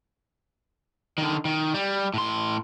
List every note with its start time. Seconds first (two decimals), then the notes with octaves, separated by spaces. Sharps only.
1.18 D3 D#3
1.45 D#3
1.74 G3
2.14 A2 C6